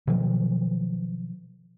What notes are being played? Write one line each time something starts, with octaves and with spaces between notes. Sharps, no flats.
B2 D#3 F3 F#3